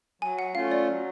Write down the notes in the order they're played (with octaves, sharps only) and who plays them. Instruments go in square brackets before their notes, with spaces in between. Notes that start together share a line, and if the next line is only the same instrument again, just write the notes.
[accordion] F#3 [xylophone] G#5
[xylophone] F#5
[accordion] A3 C#4 F4 [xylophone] F5
[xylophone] D5
[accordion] F#3